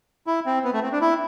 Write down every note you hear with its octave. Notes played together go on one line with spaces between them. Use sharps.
E4
C4
B3
A3
C4
D4
E4